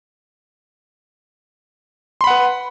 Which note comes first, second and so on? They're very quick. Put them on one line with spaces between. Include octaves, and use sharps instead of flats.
C6 B5 F#5 B4